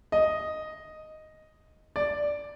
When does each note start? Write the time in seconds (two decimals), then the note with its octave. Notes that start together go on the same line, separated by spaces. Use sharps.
0.12 D#5
1.96 D5